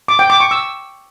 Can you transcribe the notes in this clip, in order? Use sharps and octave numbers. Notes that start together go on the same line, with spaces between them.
D6
G5
D6
C#6
E6